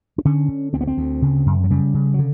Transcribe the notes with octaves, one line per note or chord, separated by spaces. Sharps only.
D4
D3 C#4
D3
D2 C4
B3
C4
D2
C#3
F#2
F#3
C#3 G3
C#3
F#3
D3